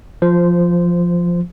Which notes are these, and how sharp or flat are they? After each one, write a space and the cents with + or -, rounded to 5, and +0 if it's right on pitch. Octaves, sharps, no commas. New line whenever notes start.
F3 +0 C5 -15